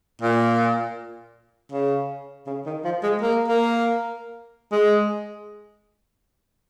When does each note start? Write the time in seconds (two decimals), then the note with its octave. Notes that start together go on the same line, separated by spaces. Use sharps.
0.22 A#2
1.72 C#3
2.47 C#3
2.66 D#3
2.84 F3
3.03 G#3
3.21 A#3
3.48 A#3
4.72 G#3